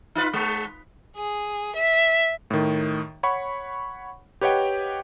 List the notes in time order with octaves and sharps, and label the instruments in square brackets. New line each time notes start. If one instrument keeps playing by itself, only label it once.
[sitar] D#4 F4 B4
G#3
[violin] G#4
E5
[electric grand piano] A2 D#3
C#5 F#5 B5 C#6
G4 B4 C#5 D#5 F#5 G5